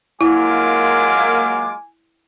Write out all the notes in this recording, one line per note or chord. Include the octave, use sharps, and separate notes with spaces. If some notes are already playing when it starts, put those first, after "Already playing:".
F#3 G#3 A#3 E4 F4 G#5 D6